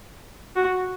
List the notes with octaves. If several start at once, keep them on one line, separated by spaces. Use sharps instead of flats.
F#4